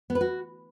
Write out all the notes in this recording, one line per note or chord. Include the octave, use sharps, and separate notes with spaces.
B3
B4
F#4